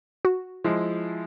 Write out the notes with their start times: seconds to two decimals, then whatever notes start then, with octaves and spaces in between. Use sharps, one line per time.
0.25 F#4
0.64 F3 G#3 E4